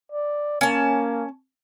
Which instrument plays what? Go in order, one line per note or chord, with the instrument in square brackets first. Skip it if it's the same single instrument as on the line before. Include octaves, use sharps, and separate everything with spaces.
[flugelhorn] D5
[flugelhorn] A#3 [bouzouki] C#4 A5